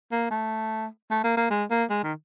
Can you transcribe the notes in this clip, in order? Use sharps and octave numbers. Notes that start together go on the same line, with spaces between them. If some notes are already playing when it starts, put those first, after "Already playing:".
A#3
A3
A3
A#3
A#3
G#3
A#3
G#3
D#3